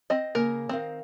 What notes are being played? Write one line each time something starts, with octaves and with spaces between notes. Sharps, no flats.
C4 D#5
C#3 A#3 A#4
D#3 C4 A#4 F5